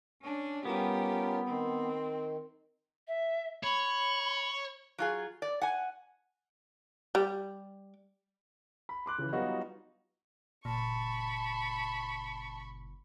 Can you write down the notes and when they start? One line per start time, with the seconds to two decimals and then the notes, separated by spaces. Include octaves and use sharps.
0.22 C#4 D4
0.65 G3 B3 C#4 F4 G4 A#4
1.47 D#3 C4
3.08 E5
3.63 C#5 B5
4.98 F#3 F4 G#4
5.42 D5
5.61 F#5 G#5
7.15 G3
8.89 B5
9.06 C6 D6 F#6
9.18 C#3 E3
9.32 F#3 G3 B3 D#4 F4 F#4
10.65 F#1 A#2 A5 B5 C#6